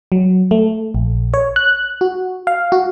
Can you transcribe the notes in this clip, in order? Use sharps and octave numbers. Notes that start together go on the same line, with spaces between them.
F#3
A3
A#1
C#5
F#6
F#4
F5
F#4